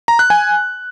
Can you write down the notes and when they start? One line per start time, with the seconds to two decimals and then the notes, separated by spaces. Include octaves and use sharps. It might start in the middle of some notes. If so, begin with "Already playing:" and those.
0.08 A#5
0.19 F#6
0.30 G#5